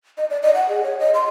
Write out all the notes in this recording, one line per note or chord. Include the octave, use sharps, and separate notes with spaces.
D#5
D5
D#5
F#5
G#4
C#5
D#5
C6